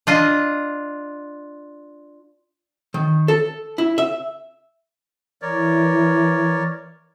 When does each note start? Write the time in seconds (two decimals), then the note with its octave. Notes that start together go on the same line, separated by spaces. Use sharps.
0.07 D4 F4 D#5
2.94 D#3
3.28 A4
3.78 E4
3.98 E5
5.42 E3 A#4 C#5 D5